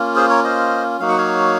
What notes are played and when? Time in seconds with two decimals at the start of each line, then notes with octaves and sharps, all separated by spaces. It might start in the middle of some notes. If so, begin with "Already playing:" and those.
Already playing: A#3 C#4 F4
0.16 G#4 C5
0.30 A#4 C#5
0.44 C5 D#5
1.00 F#3 A#3 D#4 F#4 F5
1.09 F#5
1.18 C#5 F5